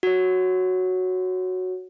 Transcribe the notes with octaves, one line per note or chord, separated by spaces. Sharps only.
F#4 C#5